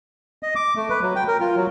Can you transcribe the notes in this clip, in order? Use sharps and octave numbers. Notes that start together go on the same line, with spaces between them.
D#5
D6
A3
B4
F#3
G5
A#4
F4
F#3